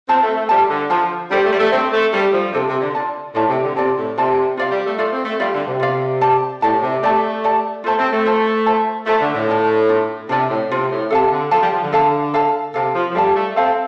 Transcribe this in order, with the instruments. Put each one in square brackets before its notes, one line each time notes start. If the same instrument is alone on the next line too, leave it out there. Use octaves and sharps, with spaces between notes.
[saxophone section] C4 [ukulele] F4 C5 A5
[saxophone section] A3
A3
[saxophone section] G3 [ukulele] F4 C5 A5
[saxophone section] D3
[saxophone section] F3 [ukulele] F4 C5 A5
[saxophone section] G3 [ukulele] D4 A4 C5
[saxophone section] A3
G3
A3
[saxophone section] C4 [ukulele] D4 A4 C5
[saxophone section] A3
[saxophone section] G3 [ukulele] D4 A4 C5
[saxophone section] F3
[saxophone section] C3 [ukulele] D4 A4 C5
[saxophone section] C3
D3
[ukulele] F4 D5 A5
[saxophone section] A2 [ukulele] F4 D5 A5
[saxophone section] C3
D3
[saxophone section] C3 [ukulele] F4 D5 A5
[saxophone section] A2
[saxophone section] C3 [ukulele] F4 D5 A5
[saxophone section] C3 [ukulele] F4 D5 F5
[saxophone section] G3
A3
[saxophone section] A3 [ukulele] F4 D5 F5
[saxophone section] C4
A3
[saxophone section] G3 [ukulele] F4 D5 F5
[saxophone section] D3
C3
[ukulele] F4 D5 F5
G4 D5 A5
[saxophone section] A2 [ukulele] G4 D5 A5
[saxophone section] C3
[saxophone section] A3 [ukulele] G4 D5 A5
[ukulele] G4 D5 A5
[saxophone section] A3 [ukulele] F4 C5 A5
[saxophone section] C4
A3
[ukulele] F4 C5 A5
F4 C5 A5
[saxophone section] A3 [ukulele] F4 C5 A5
[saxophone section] D3
A2
[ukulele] D4 F4 D5 A5
D4 F4
[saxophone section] C3 [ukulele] D4 F4 D5 A5
[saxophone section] A2
[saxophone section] C3 [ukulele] D4 F4
[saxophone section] A2
[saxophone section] C3 [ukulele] A4 F5 A5
[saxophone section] D3
[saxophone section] F3 [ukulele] A4 F5 A5
[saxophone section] G3
F3
D3
[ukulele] A4 F5 A5
A4 F5 A5
[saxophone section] C3 [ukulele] A4 F5 A5
[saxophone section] F3
F3
[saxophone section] G3 [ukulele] A4 F5 A5
[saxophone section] A3
[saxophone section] C4 [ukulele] A4 F5 A5